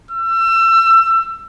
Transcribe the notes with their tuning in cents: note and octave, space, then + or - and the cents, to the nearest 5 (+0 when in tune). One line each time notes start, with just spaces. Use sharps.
E6 +30